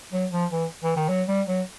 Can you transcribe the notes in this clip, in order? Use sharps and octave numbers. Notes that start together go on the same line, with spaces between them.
F#3
F3
E3
E3
D#3
F#3
G3
F#3